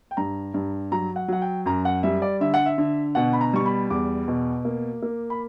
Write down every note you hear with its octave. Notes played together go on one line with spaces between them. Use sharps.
G5
G2 A#5
G2
F#3 A#5
F#5
F#3 F#5
G5
F#2 A#5
F#5
G3 E5
D5
D3 E5
F#5
E5
D3
B2 F#5
B5
A#5
G3 C#6
B5
E2 D6
B2
A#3
A#3
B5